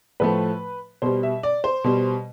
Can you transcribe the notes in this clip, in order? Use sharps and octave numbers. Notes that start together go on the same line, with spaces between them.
A2 F3 A3 B4
B2 G3 C5
E5
D5
C5
B2 G3